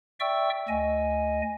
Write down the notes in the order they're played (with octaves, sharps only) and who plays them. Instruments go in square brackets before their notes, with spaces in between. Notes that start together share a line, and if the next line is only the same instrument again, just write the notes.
[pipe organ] D5 E5 G5 C#6 E6
D2 D#5 G#5